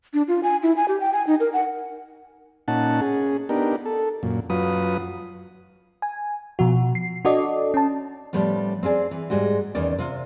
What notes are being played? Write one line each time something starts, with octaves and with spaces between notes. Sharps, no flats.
D4
F4
G#5
E4
G#5
G4
G5
G#5
D#4
A#4
F#5
A#2 C#4 D#4 F#5 A5
C#4 G#4
B3 D4 D#4 G4 A#4
A4
F#2 A#2
F#2 F#3 F4 B4 D#6
G#5
B2 F3 F#4
C7
D4 F#4 A4 D5 D#5
C#4 A5
A2 F3 G3 B3 C#4
C4 F4 G#4 D5
E3
G#2 G3 G#3 F#4
E2 D#3 C#4 D5
C3 F4